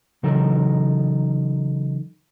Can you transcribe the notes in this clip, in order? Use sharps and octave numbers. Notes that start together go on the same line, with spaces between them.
C#3 E3 F#3 D#4 A4 A#4